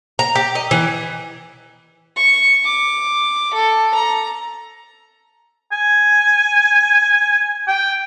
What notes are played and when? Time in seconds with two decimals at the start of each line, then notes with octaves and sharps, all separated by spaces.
0.19 A#5
0.35 G4
0.55 D#5
0.71 E3
2.17 C#6
2.65 D6
3.54 A4
3.94 A#5
5.72 G#5
7.67 G5